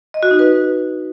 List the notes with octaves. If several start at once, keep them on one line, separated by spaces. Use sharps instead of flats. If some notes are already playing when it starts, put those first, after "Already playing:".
D#5
F#4
D#4
B4